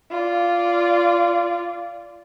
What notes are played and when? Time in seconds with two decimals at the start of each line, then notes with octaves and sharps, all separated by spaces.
0.10 F4 D5